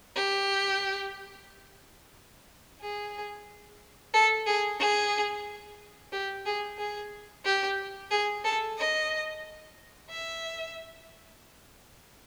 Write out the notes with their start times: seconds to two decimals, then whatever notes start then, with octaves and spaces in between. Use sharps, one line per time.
0.15 G4
2.81 G#4
4.14 A4
4.46 G#4
4.80 G#4
6.12 G4
6.46 G#4
6.78 G#4
7.45 G4
8.11 G#4
8.44 A4
8.78 D#5
10.10 E5